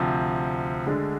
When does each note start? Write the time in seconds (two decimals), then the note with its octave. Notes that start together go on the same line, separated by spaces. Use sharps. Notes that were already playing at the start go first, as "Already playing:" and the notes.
Already playing: D2 C3 F3
0.86 D2 D3 G#3 D4